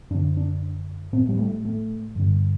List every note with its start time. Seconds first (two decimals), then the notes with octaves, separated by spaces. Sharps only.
0.10 F#2 D4
0.14 D3
0.37 D4
1.13 A2 C4
1.29 G3
1.39 A3
1.65 A3
2.16 G2 D3